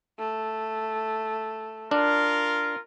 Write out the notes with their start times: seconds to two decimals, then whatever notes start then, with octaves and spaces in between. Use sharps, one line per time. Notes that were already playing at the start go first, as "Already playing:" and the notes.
0.19 A3
1.91 D4 F4 A#4